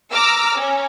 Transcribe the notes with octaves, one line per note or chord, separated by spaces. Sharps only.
A#5 D6 E6 F6
C#4